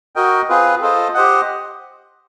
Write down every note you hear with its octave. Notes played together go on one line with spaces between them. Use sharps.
F#4 A#4 D#5 G5
C4 F4 G#4 B4
F4 A4 C5 D#5
G4 C5 D#5 F#5